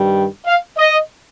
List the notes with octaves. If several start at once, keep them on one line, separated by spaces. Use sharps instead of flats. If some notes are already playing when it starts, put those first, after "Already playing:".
Already playing: G2 D#3 G3
F5
D#5